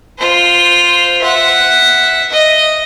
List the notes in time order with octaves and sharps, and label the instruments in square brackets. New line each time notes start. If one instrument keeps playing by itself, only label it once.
[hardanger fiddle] F4 C5
E5 F#5
D#5